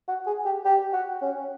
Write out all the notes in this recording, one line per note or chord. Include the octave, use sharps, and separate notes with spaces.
F#4
G#4
G4
G4
F#4
C#4